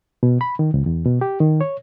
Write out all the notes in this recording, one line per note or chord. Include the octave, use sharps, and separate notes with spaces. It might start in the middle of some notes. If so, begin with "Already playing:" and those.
B2
B5
D#3
C#2
E2
B2
G4
D#3
C#5